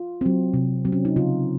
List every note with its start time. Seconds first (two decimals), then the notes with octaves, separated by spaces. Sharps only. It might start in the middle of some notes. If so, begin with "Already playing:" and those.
Already playing: F4
0.21 F#3 C4
0.54 C3
0.85 F#3 C4
0.92 C#4
1.05 D#4
1.16 C#3 F4